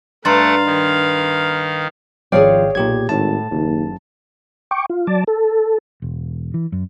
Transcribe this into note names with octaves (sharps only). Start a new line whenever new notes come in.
G2 A3 B4 F5 F#5 A#5 C6 A6
D#3
G#1 F3 G#4 C#5 D5 F5 G5
B1 A#2 G4 G#6
G#1 A2 A5
F#1 D#2
G5 C#6 D6
F4
F#3 D5 A5
A4
E1
E3
F#2